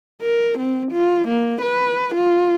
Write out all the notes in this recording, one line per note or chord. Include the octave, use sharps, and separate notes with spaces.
A#4
C4
F4
A#3
B4
F4